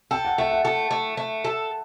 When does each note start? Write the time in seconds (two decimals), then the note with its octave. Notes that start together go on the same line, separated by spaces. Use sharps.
0.11 A4 G5
0.25 F#5
0.38 A3 E5
0.51 F#5
0.65 A3
0.91 A3
1.17 A3
1.44 A4